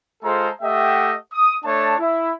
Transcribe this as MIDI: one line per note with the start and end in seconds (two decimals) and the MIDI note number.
0.23 0.49 56
0.23 0.49 65
0.23 0.49 68
0.23 0.49 69
0.23 0.49 72
0.23 0.49 82
0.62 1.15 57
0.62 1.15 67
0.62 1.15 75
0.62 1.15 76
0.62 1.15 78
0.62 1.15 79
1.32 1.56 87
1.64 1.95 57
1.64 1.95 62
1.64 1.95 73
1.64 1.95 81
1.99 2.32 64